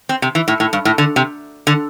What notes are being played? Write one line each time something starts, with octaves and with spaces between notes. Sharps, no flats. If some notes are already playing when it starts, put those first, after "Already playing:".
C4
C3
E3
A2
A2
G2
A2
D3
C3
D3